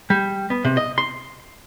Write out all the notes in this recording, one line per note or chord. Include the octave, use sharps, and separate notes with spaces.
G3
B3
C3
D#5
C6